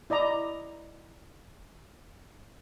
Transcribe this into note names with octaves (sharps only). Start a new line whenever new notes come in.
E4 D5 D#5 A#5